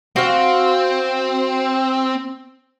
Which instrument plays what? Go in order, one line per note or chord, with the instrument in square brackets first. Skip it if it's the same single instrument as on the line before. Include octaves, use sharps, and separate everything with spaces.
[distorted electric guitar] C4 [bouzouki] F#4 F5